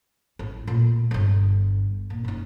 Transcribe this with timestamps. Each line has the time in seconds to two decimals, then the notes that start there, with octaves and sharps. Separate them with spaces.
0.39 A1
0.67 A#2 A3
1.11 G1 D3
2.10 A#2
2.24 F#1 D#4